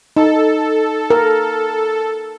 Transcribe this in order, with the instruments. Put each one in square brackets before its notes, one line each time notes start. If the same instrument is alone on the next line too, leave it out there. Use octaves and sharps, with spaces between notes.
[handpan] D#4 [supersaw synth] A4
[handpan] A#4